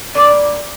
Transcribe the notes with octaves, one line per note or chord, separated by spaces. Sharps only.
A#2 G3 D4 D5